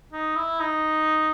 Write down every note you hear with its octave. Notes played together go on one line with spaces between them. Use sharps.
D#4
E4
D#4